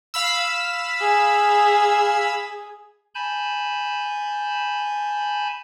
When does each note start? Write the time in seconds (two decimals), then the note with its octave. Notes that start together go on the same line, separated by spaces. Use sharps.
0.14 F5 B5 E6
1.00 G#4
3.15 G#5 A5 B5 G6